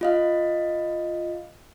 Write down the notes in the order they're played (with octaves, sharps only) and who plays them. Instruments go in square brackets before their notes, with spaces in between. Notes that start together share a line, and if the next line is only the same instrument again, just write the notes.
[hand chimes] F4 D#5 F5